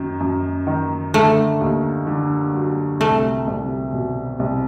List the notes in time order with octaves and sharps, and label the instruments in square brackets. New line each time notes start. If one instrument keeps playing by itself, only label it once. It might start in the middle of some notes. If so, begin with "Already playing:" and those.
Already playing: [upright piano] F#2 D#3
F#2
D#3
[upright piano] D3 [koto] A3
[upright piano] D#2
D3
F#3
[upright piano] C2 [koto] A3
[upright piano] C2
B2
C2